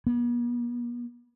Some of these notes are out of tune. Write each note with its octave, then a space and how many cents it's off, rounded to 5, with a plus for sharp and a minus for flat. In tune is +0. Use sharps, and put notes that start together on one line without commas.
B3 -45